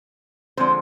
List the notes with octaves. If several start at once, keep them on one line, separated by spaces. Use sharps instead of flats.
D3 F3 G#3 C4 C5